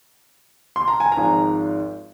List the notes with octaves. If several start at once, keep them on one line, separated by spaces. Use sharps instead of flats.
C6
A#5
G#5
A#5
G#1 G#2 F3